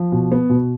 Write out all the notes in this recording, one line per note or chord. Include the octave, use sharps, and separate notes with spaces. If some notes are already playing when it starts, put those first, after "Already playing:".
Already playing: F3
B2
B3
B2